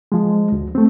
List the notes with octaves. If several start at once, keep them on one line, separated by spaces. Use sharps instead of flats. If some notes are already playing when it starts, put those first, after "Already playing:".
F3 G#3
D2
A3 C4